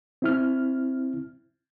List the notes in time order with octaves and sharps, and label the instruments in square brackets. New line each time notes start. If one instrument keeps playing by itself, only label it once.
[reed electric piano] C4 E4 F6